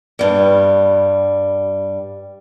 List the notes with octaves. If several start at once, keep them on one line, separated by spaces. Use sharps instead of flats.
G2 G3